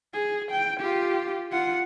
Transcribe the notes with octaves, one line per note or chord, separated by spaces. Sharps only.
G#4
G5
F4 G4
F4 F#5